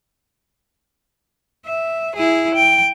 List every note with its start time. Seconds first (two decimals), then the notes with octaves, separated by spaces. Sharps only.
1.66 E5
2.16 E4 G#4
2.55 G5